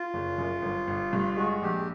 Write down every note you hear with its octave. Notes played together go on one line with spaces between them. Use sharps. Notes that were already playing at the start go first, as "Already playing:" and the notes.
Already playing: F4
F#1
F#2
G1
G1
G2
G#3 F#4
A#1 G4